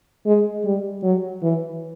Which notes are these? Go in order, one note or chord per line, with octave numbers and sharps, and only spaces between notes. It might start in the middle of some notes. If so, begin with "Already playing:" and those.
G#3
G3
F#3
E3